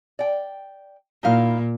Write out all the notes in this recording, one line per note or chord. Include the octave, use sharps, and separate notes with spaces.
D5 G5
A#2 D#4 E4 F5